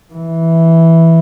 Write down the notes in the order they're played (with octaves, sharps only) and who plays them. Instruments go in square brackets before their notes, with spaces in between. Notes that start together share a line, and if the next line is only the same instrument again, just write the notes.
[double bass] E3